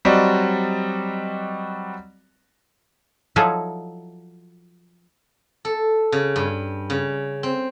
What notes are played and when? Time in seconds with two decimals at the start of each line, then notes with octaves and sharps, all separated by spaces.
0.05 F#3 G3 C4 F#4 D5 D#5
3.36 F3 F#3 D#4 E4 G#4 A4
5.65 A4
6.12 C#3
6.36 G2
6.90 C#3
7.43 C4